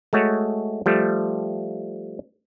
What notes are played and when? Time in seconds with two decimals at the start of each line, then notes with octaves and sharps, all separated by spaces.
0.13 G#3 A3 F#4 C#5
0.86 F3 G3 A3